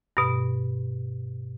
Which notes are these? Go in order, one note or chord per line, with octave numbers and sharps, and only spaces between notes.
G2 B2